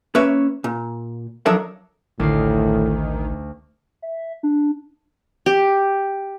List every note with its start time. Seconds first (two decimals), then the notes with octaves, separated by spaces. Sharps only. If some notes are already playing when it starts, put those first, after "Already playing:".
0.15 A#3 C#4 B4 C#5 E5
0.64 A#2
1.46 F3 F#3 D4 A4 A#4 E5
2.20 A1 D2 A2 D#3 C7
4.02 E5
4.43 D4
5.46 G4